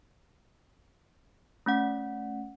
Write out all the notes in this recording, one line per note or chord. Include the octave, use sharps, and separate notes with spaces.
A3 C#4 F#5